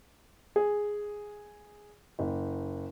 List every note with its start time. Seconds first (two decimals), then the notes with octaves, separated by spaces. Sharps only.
0.56 G#4
2.19 F#1